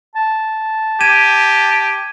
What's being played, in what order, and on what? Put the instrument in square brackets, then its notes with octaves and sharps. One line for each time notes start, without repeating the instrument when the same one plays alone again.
[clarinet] A5
[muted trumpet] G4 [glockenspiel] G#6 D#7 E7